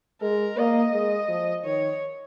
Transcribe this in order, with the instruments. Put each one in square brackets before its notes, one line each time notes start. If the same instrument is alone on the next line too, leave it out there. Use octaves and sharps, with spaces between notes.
[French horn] G#3 [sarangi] A#4
[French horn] A#3 [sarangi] D#5
[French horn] G#3
F3
[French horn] D#3 [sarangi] C#5